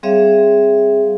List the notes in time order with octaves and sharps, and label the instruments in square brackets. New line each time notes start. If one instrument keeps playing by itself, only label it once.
[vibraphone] G3 C4 G#4 C#5 E5 F5